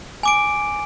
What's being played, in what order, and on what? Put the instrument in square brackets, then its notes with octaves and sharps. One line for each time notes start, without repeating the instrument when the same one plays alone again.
[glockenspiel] G#5 D6 D7